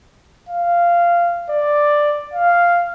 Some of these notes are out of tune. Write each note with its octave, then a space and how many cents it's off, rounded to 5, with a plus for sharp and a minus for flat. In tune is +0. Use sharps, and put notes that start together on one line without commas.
F5 -10
D5 +5
F5 -5